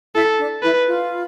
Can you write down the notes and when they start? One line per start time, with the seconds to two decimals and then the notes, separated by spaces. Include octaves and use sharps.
0.15 E4 A4
0.39 D4
0.63 E4 B4
0.87 F4